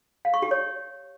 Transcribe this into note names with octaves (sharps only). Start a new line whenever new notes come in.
F5
C#6
G4
C#5